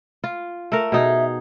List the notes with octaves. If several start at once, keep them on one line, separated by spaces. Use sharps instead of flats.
F4
A3 A#4
B2 D#4 G#4 E5